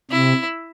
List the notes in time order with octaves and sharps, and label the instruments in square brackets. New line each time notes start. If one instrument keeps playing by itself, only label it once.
[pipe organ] C3 [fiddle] E4